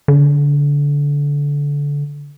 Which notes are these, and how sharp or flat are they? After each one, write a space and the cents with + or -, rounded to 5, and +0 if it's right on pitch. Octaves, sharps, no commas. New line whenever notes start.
D3 -25